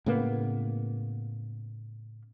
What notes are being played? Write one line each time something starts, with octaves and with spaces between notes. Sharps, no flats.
A2 C#3 A#3 B3